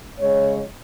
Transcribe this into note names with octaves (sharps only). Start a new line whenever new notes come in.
C#3 G#3 C#5